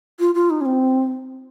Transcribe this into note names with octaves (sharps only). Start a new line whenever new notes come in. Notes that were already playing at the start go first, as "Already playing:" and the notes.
F4
F4
D#4
C#4
C4